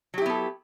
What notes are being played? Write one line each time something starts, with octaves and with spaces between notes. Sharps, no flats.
F#3 B3 E4 G4 A4